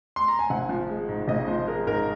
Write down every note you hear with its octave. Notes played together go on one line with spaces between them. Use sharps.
C6
A#5
G#5
G#1 F#5
F3
G#3
G#2
G#1 D#5
F3 C5
G#3 A#4
G#2 A#4